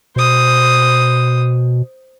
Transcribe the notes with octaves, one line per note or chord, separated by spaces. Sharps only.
B2 C5 D#6